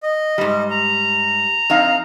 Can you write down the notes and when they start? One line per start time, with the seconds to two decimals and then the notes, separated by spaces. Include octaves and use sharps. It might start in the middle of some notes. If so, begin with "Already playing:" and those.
0.03 D#5
0.38 G#2 G3
0.70 A#5
1.70 F2 D#4 F5